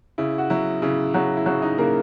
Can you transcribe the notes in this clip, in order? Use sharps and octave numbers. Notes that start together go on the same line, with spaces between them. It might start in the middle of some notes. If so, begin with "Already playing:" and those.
C#3 E4
F#4
F#3 E4
C#3 E4
C#3 F#3 F#4
E4
C#3 F#3 F#4
D#4
C#3 A#3 A#4